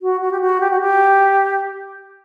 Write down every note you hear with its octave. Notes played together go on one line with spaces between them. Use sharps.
F#4
F#4
G4
F#4
G4
F#4
G4